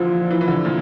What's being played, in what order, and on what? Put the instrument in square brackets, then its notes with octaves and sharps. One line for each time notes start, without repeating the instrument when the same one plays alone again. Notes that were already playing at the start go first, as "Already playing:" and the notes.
Already playing: [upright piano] A#2 D3 E3 [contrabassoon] F3
[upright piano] E3
E3
D3
A#2